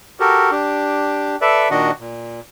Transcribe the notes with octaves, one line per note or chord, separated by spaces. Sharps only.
F#4 G4 A4 A#4
D4 G4
A4 B4 D5 E5
A#2 D#3 D4 F#4 D#5 F#5
A#2